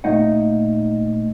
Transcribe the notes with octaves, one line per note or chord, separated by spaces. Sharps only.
A#2 A3 D#4 D#5 F#5